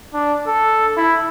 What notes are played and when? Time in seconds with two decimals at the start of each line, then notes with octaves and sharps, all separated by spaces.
0.13 D4
0.47 A4
0.97 E4